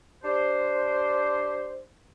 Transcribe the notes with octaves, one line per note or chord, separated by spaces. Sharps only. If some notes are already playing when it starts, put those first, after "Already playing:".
D4 G4 C5